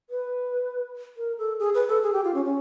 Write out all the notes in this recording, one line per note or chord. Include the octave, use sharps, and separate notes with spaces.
B4
A#4
A4
G#4
B4
A4
G#4
G4
F4
C#4
C#4